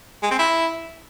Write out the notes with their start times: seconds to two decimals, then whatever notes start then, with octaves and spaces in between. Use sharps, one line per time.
0.23 G#3
0.31 C4
0.39 E4